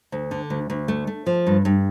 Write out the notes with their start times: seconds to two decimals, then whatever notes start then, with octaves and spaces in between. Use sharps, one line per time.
0.12 D2
0.31 D3
0.50 D2
0.70 D2
0.88 A3
1.07 A3
1.26 F3
1.47 G2
1.65 G2